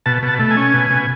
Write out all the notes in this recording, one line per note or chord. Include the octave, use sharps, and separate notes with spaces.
B2 A5
B2
A5
A3
G#5
C#4
B2
B2